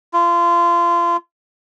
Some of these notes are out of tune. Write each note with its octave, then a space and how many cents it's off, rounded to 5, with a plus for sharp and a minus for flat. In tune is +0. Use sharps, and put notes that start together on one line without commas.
F4 -25